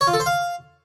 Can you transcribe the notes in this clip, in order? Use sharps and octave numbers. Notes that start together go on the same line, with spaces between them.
C#5
F4
A4
C5
F5